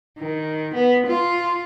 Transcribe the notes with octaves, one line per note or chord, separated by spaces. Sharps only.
D#3
B3
F4